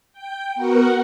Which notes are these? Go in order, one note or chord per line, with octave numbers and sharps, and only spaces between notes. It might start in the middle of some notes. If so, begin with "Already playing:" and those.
G5
B3 F#4 A#4 F#5